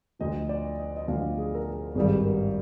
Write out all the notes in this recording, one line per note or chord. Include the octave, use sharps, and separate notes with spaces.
D2 D3 F3 D#5
D5
D#5
D#5
D2 D3 F3 F5
G#4
A#4
G#4
G#1 G2 D#3 G3 G#4
A#4